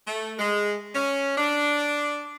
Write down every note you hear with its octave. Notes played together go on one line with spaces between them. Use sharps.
A3
G#3
C#4
D4